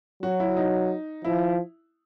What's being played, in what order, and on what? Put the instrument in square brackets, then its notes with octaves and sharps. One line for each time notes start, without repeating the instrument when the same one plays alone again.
[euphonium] F#3 [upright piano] F#4
[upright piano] E4
D#4
[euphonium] F3 [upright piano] E4